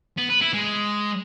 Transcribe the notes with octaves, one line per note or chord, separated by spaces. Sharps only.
B3
B4
E4
G#3